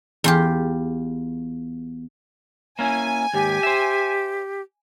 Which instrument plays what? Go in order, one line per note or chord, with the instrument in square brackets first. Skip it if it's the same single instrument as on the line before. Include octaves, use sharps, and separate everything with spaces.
[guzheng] E2 F4 G4
[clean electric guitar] A#3 C#4 E4 [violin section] G#5
[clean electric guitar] D#2 G#2 [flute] G4
[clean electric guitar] C5 E5